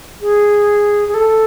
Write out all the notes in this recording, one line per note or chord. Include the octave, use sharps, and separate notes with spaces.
G#4
G#4
A4